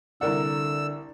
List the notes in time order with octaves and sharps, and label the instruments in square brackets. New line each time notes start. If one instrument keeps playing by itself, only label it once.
[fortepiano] C2 A#4 F#5 [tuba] D3 [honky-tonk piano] D4 A#5 [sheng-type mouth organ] E6